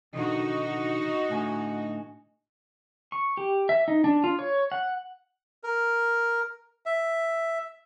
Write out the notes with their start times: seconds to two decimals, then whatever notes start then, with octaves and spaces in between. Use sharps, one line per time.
0.13 B2 D3 D#3 D#4 F#4
1.29 A2 D3 G#5
3.12 C#6
3.37 G4
3.69 E5
3.88 D#4
4.04 D4
4.24 F4
4.39 C#5
4.72 F#5
5.64 A#4
6.86 E5